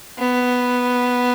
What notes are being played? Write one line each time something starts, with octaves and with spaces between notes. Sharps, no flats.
B3